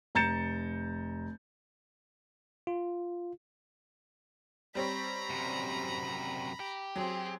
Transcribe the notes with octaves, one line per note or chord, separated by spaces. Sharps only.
F1 A#5 G6 A6 C#7 E7
F4
G3 C4 C#5 A#5 B5
F#2 C3
G4
F#3 C4 G#4